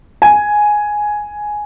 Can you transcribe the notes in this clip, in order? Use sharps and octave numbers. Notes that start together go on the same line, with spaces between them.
G#5